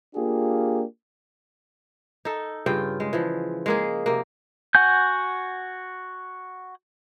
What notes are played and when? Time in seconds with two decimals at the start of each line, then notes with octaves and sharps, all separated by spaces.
0.15 A#3 D4 F4 G4 G#4
2.25 D#4 A4
2.66 G2 C#3 F4 G5
3.00 G#3
3.13 E3 F3
3.66 G#3 A#3 G#4
4.06 C3 A#3
4.75 F#4 F#5 G#5 G6